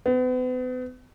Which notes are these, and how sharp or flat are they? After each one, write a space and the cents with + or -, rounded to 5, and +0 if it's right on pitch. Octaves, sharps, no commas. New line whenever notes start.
B3 +40